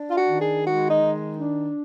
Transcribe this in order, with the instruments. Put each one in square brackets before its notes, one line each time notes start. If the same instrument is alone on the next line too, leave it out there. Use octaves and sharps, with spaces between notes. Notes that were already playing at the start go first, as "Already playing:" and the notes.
Already playing: [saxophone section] D4
F4
F#4
D#3
G#4
G#3 F#4
D#4
D#3
D4